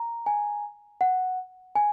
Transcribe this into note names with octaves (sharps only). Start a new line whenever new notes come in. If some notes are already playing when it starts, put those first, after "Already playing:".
Already playing: A#5
G#5
F#5
G#5